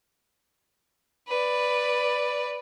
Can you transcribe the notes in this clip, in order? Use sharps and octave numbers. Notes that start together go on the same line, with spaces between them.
B4 D5